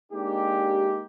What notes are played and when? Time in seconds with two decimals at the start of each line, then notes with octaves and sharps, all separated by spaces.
0.12 G#3 A#3 D4 D#4 G4